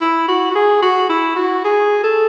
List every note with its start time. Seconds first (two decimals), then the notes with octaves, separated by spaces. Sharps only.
0.01 E4
0.28 F#4
0.51 F#4
0.55 G#4
0.82 F#4
1.09 E4
1.36 F#4
1.64 G#4
2.04 A4